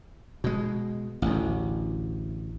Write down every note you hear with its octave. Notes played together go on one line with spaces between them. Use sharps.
B2 G#3
A1 D2